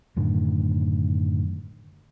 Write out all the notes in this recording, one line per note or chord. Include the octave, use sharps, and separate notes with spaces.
F#2 A2 D3 D#3